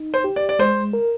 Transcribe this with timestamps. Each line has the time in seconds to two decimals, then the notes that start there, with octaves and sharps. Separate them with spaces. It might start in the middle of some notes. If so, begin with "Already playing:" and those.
Already playing: D#4
0.14 C5
0.24 G4
0.36 D5
0.49 D5
0.59 G#3 C5
0.93 A#4